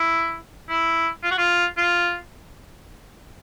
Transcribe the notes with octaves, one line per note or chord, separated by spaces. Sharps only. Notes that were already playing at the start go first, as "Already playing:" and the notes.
Already playing: E4
E4
F4
F#4
F4
F4